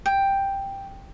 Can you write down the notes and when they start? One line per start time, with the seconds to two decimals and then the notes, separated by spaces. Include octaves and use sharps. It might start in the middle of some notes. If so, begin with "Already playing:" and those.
0.06 G5